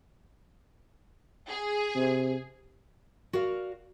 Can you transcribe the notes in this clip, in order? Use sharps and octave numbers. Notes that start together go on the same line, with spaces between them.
G#4
C3
F#4 A#4 D5 F5